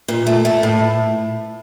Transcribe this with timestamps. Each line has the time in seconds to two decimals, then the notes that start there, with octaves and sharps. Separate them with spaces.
0.08 A#2
0.27 A3
0.45 A3
0.63 A2